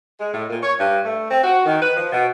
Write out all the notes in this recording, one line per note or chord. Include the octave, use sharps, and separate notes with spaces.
G#3
A2
A#2
C#5
G2
A3
C4
F#4
D#3
B4
F3
B2